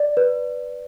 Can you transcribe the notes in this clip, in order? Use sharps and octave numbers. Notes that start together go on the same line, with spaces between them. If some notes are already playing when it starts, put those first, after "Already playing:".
Already playing: D5
B4